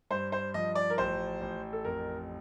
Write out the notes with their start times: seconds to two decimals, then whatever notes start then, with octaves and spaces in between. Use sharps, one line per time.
0.11 G2 C5
0.32 C5
0.54 F3 D#5
0.75 D5
0.90 A#4
0.98 A1 C5
1.41 A1
1.73 A4
1.84 F2 A#4